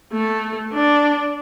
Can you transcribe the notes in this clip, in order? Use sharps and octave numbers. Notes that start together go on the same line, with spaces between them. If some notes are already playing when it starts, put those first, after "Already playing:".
A3
D4